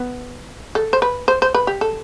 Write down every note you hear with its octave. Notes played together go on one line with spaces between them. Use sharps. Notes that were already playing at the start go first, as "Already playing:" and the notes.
Already playing: B3
A4
C5
B4
C5
C5
B4
G4
A4